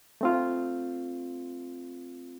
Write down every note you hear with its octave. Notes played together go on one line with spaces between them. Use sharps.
A3 C4 F4